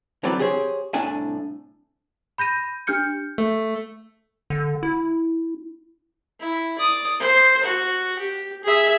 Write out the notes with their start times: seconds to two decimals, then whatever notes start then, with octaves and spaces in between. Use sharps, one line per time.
0.24 D3 E3 F#3 C4 B4 D5
0.39 G4 G#4 C5 C#5
0.94 C2 A2 D4 G#5
2.38 B5 G6 A#6 D#7
2.87 D4 G4 F6 G6 C#7
3.38 A3
4.50 D3
4.83 E4
6.40 E4
6.79 D5 D#6
7.20 C5
7.63 F#4
8.19 G4
8.64 G#4 E5